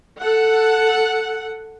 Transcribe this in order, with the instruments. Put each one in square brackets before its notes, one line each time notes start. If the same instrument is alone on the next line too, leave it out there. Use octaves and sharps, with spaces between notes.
[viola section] A4 F#5